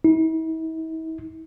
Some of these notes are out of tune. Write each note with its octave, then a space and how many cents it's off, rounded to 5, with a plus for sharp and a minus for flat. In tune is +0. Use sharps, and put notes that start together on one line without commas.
E4 -45